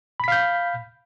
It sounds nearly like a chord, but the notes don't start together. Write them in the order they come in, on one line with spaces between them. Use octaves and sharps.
B5 B6 F5 G6